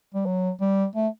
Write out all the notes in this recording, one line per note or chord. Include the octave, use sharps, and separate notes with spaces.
G3
F#3
G3
A3